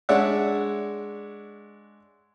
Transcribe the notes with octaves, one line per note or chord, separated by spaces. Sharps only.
G#3 D4 C#5 D5 E5 F#5